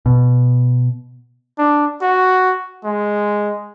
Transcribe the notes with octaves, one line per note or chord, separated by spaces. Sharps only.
B2
D4
F#4
G#3